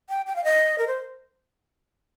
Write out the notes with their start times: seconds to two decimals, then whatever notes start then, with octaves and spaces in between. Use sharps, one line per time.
0.09 G5
0.27 G5
0.36 F5
0.44 D#5
0.78 A#4
0.87 C5